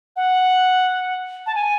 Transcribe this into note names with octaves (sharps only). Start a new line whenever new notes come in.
F#5
A5
G#5